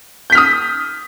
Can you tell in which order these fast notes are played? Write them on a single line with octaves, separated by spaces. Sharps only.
G6 B6 F6 D#6